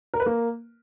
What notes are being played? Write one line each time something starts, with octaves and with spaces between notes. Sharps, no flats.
A#4
B4
A#3